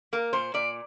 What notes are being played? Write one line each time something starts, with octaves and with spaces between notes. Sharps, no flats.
A#3 A#4
A#2 C5
A#2 D5